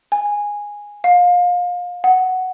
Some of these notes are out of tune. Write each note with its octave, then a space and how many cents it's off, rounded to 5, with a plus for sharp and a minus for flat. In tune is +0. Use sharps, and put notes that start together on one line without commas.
G#5 -10
F5 +30
F#5 +5